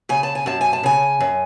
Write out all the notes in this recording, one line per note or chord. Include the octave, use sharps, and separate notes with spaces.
C#3 G#5
A5
G#5
F#2 A5
G#5
A5
C#3 G#5
F#2